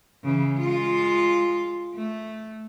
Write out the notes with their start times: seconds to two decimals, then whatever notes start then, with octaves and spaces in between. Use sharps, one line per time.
0.24 C#3 E3
0.55 G#3 F4
1.95 A3